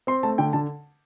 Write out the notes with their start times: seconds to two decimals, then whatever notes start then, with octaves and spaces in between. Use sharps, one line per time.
0.07 C4 C6
0.23 A3 A5
0.38 D3 G5
0.53 D3 A5